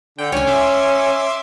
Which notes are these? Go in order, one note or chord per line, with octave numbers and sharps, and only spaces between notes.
D3 G5
C#2 C#4 C#5 G#5
E5 C6 D6